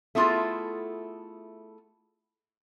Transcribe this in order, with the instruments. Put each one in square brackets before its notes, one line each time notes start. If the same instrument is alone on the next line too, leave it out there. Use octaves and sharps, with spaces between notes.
[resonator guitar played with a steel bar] A3 B3 E4 F4 G#4 A4